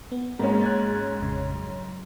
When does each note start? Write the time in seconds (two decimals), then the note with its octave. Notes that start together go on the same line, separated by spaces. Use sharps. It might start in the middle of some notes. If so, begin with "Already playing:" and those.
0.12 B3
0.39 G#2 G#3 A#3 C#4 F#4
0.61 F#6 G#6 A6
1.20 A1 F2 C#3
1.55 F#3